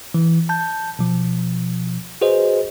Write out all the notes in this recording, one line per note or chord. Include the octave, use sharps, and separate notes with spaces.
E3
A5 G6
B2 F3
F#4 G#4 B4 C5 D#5